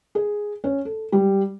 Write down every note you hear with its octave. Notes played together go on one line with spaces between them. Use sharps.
G#4
C#4
A4
G3